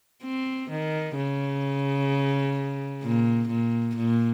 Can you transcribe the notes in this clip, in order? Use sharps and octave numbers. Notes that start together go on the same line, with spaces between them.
C4
D#3
C#3
A#2
A#2
A#2